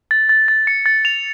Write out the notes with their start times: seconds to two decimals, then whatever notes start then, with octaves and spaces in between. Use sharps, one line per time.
0.11 A6
0.29 A6
0.48 A6
0.67 C#7
0.86 A6
1.05 F7